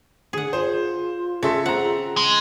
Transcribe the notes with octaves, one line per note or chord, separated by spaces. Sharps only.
D3 G#4 F#5
F4 C5
C#3 A4 E5 C6
C4 F#5 A#5
G#3